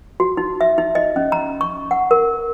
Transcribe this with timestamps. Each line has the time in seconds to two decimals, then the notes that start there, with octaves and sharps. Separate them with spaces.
0.20 F#4
0.37 D#4
0.61 E5
0.78 D#4
0.95 D#5
1.16 C#4
1.32 A#5
1.61 C#6
1.91 F#5
2.11 A#4